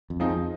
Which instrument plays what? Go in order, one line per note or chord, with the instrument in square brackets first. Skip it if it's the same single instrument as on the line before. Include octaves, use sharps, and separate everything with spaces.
[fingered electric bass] F2
[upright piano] F3 C4 D#4 G#4
[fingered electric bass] F2